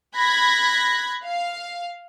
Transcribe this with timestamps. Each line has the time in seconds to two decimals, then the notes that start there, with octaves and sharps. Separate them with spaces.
0.17 B5 F#6 G#6 A#6
1.25 F5